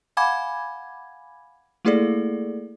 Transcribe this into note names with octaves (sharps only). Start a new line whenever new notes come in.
F5 F#5 G#5 B5 D6 G#6
A3 A#3 E4 G#4 A4 D5